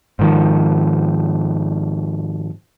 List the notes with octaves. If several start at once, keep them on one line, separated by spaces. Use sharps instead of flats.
G#2 D#3 F3